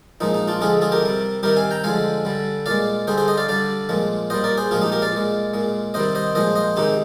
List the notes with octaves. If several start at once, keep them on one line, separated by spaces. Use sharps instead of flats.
A#2 F3 G#3 D#4
D#4
D4 F4
D3 F3 G#3 F4 G#4
F4 G#4
G4 A#4
C3 G3
C3 D#3 G3 G4 A#4
F5 G#5
G5 A#5
D3 F3 G#3 F5 G#5
D3 G3
A#2 G#3 D5 F5
D3 G3 G#4 C5
G#4 C5
C5 D#5
D5 F5
D3 G3 D5 F5
A#2 F3 G#3
A#2 G3 C5 D#5
A#4 D5
G#4 C5
A#2 F3 G#3 F4 G#4
D#4 G4
G4 A#4
D5 F5
A#2 G#3
A#2 G#3
C3 D#3 G3 C5 D#5
C5 D#5
A#2 F3 G#3 C5 D#5
C5 D#5
C3 D#3 G#3 D#4 G4